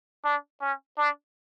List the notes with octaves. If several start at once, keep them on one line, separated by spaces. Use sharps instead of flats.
D4
C#4
D4